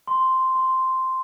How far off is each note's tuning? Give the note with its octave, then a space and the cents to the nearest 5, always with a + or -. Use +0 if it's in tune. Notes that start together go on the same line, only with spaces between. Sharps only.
C6 -5
C6 -5